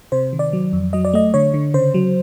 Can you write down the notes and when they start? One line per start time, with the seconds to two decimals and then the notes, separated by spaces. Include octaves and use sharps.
0.12 C3 C5
0.33 D#3
0.39 D5
0.53 F#3
0.73 F2
0.93 F#3 D#5
1.05 D5
1.13 A3 D#5
1.34 D3 C#5
1.54 D3
1.74 C#3 C5
1.94 F#3